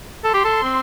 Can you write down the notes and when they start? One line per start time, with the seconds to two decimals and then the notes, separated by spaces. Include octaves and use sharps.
0.24 A4 C6
0.34 G4
0.44 A4
0.63 C4